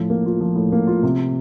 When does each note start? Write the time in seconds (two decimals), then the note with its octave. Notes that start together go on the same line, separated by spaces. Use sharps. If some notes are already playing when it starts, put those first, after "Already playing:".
Already playing: A2 F3
0.10 A#3
0.26 F4
0.41 F3
0.56 A2
0.72 A#3
0.87 F4
1.03 C3